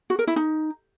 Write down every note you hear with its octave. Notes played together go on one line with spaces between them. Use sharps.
F#4
A#4
E4
D#4